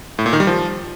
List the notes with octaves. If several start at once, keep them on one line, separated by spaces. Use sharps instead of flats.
A2
A#2
D#3
G3
F3